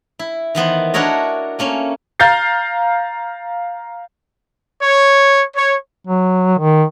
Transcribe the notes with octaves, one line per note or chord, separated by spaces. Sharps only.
E4
D#3 E3 B3 C5
D4 E4 F#4 A#4 C#5 D#5
A3 A#3 C#4
F5 A#5 F6 G6 A6 C7
C#5
C#5
F#3
D#3